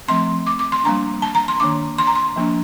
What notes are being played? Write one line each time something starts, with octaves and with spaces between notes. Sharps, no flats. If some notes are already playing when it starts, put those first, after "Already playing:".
F3 A3 C4 C6
D6
D6
C6
G3 A#3 D4 A#5
A5
A#5
C6
D#3 A#3 D4 D6
C6
A#5
C6
F3 A#3 D4